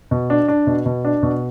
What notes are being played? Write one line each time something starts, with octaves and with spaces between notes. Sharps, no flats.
B2
D4
D4
B2
B2
D4
B2